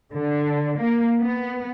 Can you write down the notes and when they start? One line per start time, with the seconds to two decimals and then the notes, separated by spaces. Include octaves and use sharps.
0.14 D3
0.78 A#3
1.22 B3